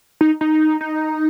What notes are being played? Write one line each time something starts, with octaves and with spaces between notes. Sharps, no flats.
D#4
D#4
D#4